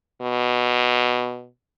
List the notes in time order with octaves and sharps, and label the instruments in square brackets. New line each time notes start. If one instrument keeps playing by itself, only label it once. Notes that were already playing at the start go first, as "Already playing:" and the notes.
[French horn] B2